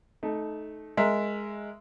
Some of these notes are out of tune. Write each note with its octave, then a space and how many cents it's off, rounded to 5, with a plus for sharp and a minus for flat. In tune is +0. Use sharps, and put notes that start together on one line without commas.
A3 -20 D#4 +0
G#3 +0 A#4 -15 E5 +0